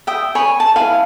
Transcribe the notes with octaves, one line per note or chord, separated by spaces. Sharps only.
E5 G5 D#6
C#5 G#5 B5
A5
E4 F5 G#5 B5